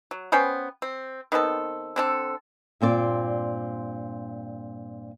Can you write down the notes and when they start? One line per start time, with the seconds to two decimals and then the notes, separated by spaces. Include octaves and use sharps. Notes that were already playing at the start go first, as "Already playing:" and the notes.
0.11 F#3
0.32 B3 C#4 C5 G5
0.82 C4
1.32 D#3 B3 C4 A4
1.96 D3 C4 A4
2.81 G2 A#2 C4 D5